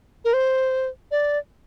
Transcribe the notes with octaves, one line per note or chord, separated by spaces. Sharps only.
A#4
C5
D5